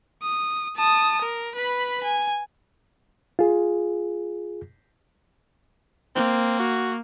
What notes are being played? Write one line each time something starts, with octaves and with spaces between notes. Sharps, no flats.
D#6
A5 D#6
A#4
B4 B5
G#5
F4 G#4
A#3 C4
F#4